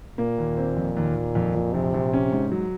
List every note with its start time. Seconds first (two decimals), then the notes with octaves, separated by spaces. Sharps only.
0.18 A#2 A#3
0.38 D#2
0.57 C4
0.77 F2
0.96 D#2
1.15 D#2
1.35 F2
1.55 F2
1.73 A#1 C3
1.94 A#1
2.13 C#4
2.32 G#2
2.52 F#3